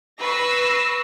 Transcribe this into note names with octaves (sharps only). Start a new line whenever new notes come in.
B4 C#6 E6 A#6 C7